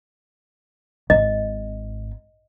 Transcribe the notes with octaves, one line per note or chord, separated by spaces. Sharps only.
G#1 D#5